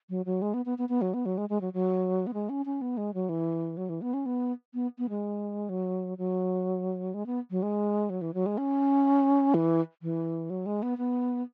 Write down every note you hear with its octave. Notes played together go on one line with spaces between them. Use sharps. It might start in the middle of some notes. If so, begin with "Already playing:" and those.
F#3
F#3
G#3
B3
B3
B3
B3
F#3
B3
F#3
G#3
G#3
F#3
F#3
B3
G#3
C#4
C#4
B3
G#3
F#3
E3
F#3
E3
B3
C#4
B3
B3
B3
G#3
F#3
F#3
G#3
B3
F#3
G#3
F#3
E3
F#3
G#3
C#4
E3
E3
F#3
G#3
B3
B3